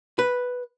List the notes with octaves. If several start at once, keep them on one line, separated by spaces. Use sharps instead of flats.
B4